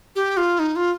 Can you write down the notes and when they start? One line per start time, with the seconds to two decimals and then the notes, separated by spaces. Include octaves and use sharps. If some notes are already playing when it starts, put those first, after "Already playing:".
0.16 G4
0.37 F4
0.59 D#4
0.76 F4